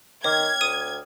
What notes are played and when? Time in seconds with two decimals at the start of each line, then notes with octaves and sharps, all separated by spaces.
0.24 D#3 C#5 G5 D6 F6 G#6
0.61 D2 D#6 D#7